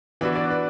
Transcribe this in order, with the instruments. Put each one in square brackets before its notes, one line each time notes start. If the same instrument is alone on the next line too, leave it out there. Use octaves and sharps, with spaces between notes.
[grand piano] E3 B3 D4 F#4 [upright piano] B4
[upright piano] D5
B4